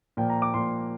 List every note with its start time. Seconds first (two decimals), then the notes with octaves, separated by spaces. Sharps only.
0.17 A#2 F3 A#3 G5
0.30 A#5
0.42 D6
0.54 A#2 F3 A#3 C6